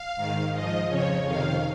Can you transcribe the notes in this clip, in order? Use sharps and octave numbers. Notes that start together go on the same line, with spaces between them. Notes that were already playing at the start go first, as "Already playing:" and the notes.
Already playing: F5
G#2 D#3
G#2 F3 D#5
F2 C#3 F3 C#5
F2 C3 D#3 F5